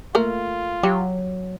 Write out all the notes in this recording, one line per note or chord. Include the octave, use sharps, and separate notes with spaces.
A3 A#3 F4 A#4
F#3 G4